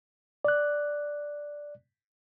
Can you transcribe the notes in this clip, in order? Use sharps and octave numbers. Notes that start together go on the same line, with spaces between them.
D5 F#6